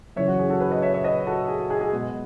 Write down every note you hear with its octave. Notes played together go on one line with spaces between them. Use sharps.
F#2 C#3 E3 C#5 E5
F#4
G#4
F#4 A4
G#4 B4
B4 D#5
C#5 E5
C#5 E5
B4 D#5
F#4 A4
G#4
F#4
G#4
G#4
B2 G#3 B3